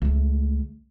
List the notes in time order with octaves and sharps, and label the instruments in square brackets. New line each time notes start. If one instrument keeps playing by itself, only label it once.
[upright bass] C#2 A3